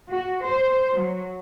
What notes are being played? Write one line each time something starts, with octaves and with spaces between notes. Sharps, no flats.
F#4
C5
F#3